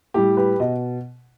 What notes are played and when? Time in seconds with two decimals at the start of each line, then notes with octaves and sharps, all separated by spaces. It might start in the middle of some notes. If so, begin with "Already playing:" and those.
0.14 A2 G3 G4
0.37 G4 B4
0.60 B2 D#5